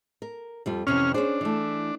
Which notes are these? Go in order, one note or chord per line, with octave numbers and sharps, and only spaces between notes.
A#4
F2 G3 F4
F2 C3 E3 C#4 F6
C#4 D4 G#4 C5
E3 A3